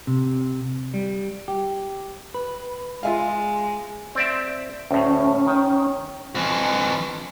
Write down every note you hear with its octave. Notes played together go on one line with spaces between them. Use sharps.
C3
G3
G4
B4
G#3 F4 E5 F5
C4 D5 E5
D2 A2 C#4
D#3
F2 E3